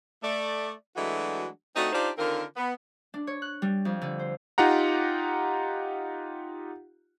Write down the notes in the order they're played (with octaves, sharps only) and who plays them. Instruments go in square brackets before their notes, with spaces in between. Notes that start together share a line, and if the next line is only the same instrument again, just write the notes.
[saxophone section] A3 D5
E3 F#3 G#3 A3 D4 F#4
A3 C4 D4 D#4 F#4
D4 D#4 F4 G4 C5 D5
D3 D#3 C4 F4 A#4
B3
[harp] D4
C#5
F#6
G3
F2
D3
C5
[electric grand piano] D#4 F4 G4 F#5 A#5